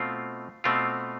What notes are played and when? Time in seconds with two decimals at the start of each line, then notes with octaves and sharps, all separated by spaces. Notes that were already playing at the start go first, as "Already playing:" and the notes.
Already playing: B2 A3 C4 F4
0.64 B2 A3 C4 F4